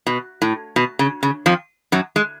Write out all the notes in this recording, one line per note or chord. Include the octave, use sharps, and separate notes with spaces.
B2
A2
B2
C#3
C#3
F2 F3
F#2 F#3
G#3